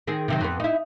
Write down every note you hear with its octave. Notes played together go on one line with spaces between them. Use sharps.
D#3 C4 G#4
C3 D#3 F#3
F2 B3
D#4 E4